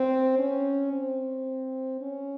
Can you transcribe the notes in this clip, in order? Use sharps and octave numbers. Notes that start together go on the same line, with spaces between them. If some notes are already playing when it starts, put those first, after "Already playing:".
Already playing: C4
C#4
C4
C#4